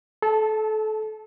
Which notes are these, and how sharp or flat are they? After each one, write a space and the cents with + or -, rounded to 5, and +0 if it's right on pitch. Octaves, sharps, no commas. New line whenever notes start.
A4 -30 A5 +0